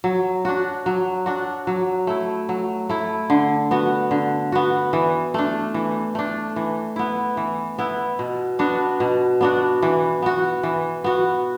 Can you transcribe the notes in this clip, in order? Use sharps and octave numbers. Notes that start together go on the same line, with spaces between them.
F#3
D4 F#4
F#3
D4 F#4
F#3
A3 E4
F#3
A3 E4
D3
B3 F#4
D3
B3 F#4
E3
A3 D4
E3
A3 D4
E3
B3 E4
E3
B3 E4
B2
B3 D4 F#4
B2
B3 D4 F#4
E3
B3 F#4
E3
B3 F#4